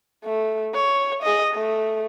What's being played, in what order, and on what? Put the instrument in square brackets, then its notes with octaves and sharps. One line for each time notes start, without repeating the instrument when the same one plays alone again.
[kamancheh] A3
C#5
G#4 D#5
A3